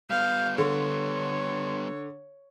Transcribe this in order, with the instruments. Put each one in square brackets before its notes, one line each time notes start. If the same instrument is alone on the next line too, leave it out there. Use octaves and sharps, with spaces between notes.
[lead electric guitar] G3 B3 [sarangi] F5 [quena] G6
[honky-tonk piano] D3 [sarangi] C#5 [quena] C6